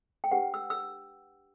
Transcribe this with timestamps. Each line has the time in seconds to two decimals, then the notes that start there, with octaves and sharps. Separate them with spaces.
0.24 G5
0.31 D4 G4 B4 F#5
0.54 E6
0.70 E6